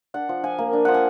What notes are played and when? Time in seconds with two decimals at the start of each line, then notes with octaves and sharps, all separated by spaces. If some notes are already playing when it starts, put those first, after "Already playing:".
0.14 D4 F#5
0.29 F3
0.44 F3 G#5
0.58 A#3
0.73 D4
0.85 F3 F#5
0.94 G#5